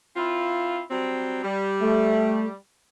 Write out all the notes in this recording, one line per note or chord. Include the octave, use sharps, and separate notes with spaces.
C4 E4 F4
F#3 G3 C4
G3
A3